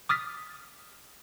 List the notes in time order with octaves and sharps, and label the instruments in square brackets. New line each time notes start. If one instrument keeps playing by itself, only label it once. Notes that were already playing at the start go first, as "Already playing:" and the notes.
[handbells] D6 D#6 F6 A6 B6